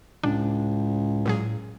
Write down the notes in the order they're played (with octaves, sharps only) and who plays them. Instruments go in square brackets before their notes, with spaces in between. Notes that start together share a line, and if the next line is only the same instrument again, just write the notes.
[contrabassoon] C#2 [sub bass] A2 [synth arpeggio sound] D4
[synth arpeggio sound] A#2 F#3 G#4